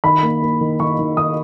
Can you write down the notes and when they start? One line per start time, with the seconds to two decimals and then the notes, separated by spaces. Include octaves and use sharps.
0.04 D#3 B5
0.23 A#3
0.42 A#3
0.61 D#3
0.80 D#3 C#6
0.99 D#3
1.17 D#3 D#6